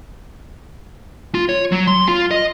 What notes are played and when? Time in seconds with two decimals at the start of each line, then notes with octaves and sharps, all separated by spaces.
1.35 F4
1.49 C#5
1.72 F#3
1.87 C6
2.08 F4
2.31 D#5